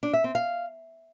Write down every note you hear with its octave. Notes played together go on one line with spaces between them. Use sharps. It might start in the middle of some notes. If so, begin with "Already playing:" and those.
D4
E5
C4
F5